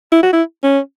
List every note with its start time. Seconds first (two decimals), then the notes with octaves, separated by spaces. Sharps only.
0.12 E4
0.23 F#4
0.33 E4
0.63 C#4